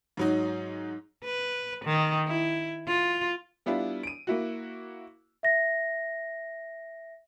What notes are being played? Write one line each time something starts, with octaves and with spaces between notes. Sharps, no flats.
G#2 F#3 D#4
B4
D#3
E4
F4
G3 B3 D4 E4 F4
D7 D#7
A#3 E4 F#4
E5 A#6